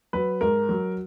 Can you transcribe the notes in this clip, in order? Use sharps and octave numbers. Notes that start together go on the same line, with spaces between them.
F#3 B4
G#2 A#4
F#3